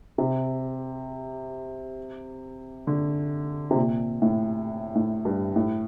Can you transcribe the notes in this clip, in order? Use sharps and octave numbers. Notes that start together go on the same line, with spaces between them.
C3
D3
C3
A#2
A2
A2
G2
A2